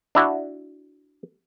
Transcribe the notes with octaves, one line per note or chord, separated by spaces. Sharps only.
D4 E4 F#4